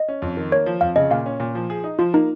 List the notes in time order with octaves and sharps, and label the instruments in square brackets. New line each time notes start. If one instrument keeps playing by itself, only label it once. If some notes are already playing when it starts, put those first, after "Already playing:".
Already playing: [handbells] D#5
[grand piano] C#4
F2
D#3
[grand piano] A#3 [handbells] C#5
[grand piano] F3
[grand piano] F2 [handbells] F5
[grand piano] C#3 [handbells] D#5
[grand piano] A#2 [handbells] F5
[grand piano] C#4
A#2
F3
G#4
D#4
[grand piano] F3 [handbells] F4
[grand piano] A#3 [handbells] D#4